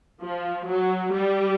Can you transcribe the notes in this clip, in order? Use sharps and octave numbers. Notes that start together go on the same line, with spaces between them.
F3
F#3
G3